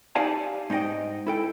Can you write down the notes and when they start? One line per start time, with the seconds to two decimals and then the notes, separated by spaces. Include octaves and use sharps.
0.15 D#4 G4 D5 F5 G#5 A5
0.70 G#2 D#4 E4 D#5 G5
1.27 E4 A4 G5